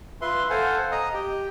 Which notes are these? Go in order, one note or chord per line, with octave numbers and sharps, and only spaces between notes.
F4 B4 E5 C6
A4 C5 F5 F#5 G#5
D#5 A#5 D#6
G4 G5